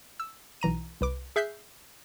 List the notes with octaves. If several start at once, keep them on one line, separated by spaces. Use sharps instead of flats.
E6
B1 E3 A#5 D#7
C2 B4 D6
G#4 E5 F#6 G6 B6 C7